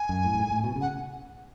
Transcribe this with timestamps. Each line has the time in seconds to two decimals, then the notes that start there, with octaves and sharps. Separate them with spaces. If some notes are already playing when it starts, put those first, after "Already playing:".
Already playing: G#5
0.09 F#2
0.25 A2
0.34 F#2
0.40 G#2
0.52 A2
0.64 B2
0.76 C#3
0.81 F#5